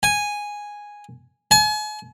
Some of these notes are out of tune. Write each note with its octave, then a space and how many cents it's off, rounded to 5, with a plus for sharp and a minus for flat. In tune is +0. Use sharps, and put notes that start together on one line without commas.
G#5 -5
G#5 +40